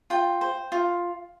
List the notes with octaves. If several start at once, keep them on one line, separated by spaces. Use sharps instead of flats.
F4 G5
C5
F4